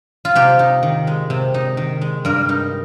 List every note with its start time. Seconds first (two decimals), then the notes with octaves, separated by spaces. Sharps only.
0.25 F4
0.35 C3 G4
0.59 D#4
0.83 D#3
1.07 G#3
1.30 C3
1.54 D#4
1.77 D#3
2.01 G#3
2.25 G2 A#4
2.49 D#4